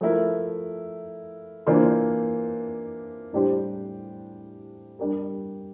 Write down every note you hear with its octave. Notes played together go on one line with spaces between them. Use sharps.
F3 A3 E4 A#4
E3 A#3 D4 F4 C5
A2 G3 D4 G4 C5
G3 D4 G4 A#4